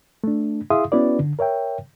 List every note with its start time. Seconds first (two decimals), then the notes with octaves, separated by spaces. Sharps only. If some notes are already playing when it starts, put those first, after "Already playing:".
0.24 A3 D4
0.70 E4 G#4 E5 F5 C6 D#6
0.92 B3 C#4 E4 F#4 B4 D5
1.19 D3
1.39 A#4 C#5 E5 G5